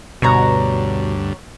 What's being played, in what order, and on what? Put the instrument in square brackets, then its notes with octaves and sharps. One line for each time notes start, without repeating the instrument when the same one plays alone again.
[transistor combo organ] D2 G2 [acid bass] B2 [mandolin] F#4 C#5 A#5